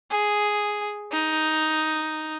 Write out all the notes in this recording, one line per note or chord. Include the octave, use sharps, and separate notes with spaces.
G#4
D#4